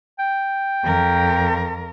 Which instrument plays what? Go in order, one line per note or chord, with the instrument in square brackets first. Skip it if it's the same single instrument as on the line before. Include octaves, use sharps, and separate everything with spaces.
[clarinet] G5
[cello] F2 A#4